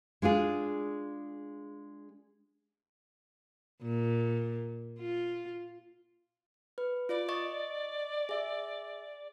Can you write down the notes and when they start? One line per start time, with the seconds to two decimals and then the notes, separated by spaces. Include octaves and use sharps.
0.22 G#3 D4 F4 G#4
3.82 A#2
5.00 F4
6.78 B4
7.09 F4 D5
7.29 D#5 C#6 A6
8.29 G#4 E5